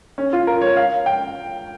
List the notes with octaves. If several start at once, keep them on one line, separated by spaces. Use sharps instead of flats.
C#4
F4
A#4
C#5
F5
G5